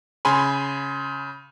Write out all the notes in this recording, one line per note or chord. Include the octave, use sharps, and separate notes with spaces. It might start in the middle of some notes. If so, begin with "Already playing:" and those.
C#3 G#5 B5 C6